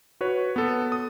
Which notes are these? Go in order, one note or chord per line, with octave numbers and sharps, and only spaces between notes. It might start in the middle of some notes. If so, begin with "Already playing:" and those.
F#4 B4 C#5
B3 A4
D#6